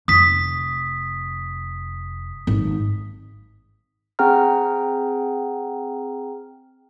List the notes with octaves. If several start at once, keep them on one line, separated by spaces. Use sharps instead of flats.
F1 D#6 B6
G#1
C4 G#4 F#5 G5 A#5 F6